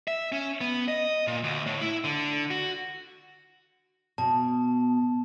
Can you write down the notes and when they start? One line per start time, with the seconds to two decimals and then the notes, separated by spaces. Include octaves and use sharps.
0.08 E5
0.32 C#4
0.61 B3
0.88 D#5
1.27 A#2
1.44 D2
1.66 A2
1.81 E4
2.04 D3
2.51 F#4
4.18 B2 A5